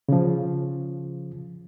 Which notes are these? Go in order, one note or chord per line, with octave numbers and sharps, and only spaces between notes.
C#3 F3